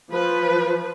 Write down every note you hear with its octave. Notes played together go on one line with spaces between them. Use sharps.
F3 B4